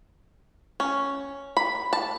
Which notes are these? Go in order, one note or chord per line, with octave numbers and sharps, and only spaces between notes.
C#4
B5
A5